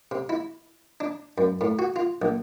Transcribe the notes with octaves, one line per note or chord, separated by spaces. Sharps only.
C3
E4
D4
F#2
A2
F#4
F4
A#1